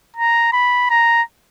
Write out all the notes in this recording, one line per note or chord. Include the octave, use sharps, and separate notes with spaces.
A#5
B5
A#5